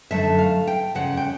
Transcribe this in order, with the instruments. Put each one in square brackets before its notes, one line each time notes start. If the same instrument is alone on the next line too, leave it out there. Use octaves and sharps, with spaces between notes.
[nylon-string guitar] F#2 D3 F#3 A3 E5
F5
G5
F2 C#3 F#5
G5